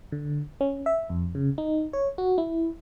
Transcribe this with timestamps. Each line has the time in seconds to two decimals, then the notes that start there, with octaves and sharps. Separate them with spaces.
0.12 D3
0.61 C#4
0.86 E5
1.10 F2
1.35 C#3
1.58 D#4
1.93 C#5
2.18 F#4
2.38 E4